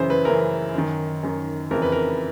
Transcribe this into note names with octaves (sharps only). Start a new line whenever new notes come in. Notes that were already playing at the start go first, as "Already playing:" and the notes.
Already playing: F#2 C#3 E3 C5
B4
F#2 C#3 E3 A#4
F#2 D#3
F#2 D#3
F2 C#3 E3 A#4
B4
A#4